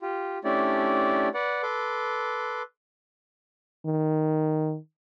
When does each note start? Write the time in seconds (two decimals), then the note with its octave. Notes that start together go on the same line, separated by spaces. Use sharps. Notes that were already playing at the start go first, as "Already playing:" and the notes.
0.01 F4 G4
0.44 A3 C#4 D4 E4 G4 D5
1.34 B4 D5 F#5
1.63 A4 B4 C6 D6
3.86 D#3